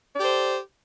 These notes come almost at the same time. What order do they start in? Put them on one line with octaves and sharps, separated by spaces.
D5 G4 A4 C5